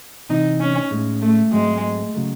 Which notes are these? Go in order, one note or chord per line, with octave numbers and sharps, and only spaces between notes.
C3 E3 C4 D#4
C#4
A2 G#3 C#4
A3
G#2 F#3 G#3 A3 C4
C#3 F#3 A3